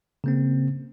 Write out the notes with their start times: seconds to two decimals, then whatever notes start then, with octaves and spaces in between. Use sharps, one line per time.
0.24 C#3 A#3 C4